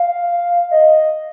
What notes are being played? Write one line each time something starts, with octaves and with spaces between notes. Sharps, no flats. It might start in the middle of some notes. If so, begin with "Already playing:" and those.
Already playing: F5
D#5